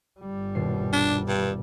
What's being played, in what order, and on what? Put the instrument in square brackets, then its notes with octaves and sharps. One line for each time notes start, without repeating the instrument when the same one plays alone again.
[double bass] G1 G3
[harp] D#1 B2 C7
[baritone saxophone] D4
G2